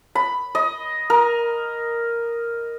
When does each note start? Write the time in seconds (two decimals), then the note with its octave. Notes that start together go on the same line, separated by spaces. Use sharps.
0.15 B5
0.55 D#5
1.10 A#4